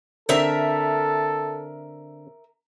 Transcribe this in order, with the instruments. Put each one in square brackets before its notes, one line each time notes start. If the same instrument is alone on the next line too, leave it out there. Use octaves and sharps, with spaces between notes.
[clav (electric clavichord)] D3 C4 D4 [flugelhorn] A4 [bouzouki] A#4 E5